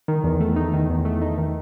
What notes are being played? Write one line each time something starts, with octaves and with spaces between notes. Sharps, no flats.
D#3
E2
A3
D#4
D#3
E2
A3
D#4
D#3